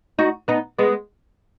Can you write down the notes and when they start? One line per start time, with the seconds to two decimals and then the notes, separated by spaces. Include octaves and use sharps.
0.19 D#4 F#4
0.48 B3 D#4
0.79 G#3 B3